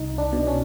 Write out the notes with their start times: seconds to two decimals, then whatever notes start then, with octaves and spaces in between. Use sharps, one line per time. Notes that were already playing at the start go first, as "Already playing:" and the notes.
Already playing: C2 D#4
0.18 D4
0.33 B2
0.47 C#4